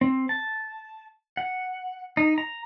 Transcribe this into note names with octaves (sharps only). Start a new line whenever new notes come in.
C4
A5
F#5
D#4
A#5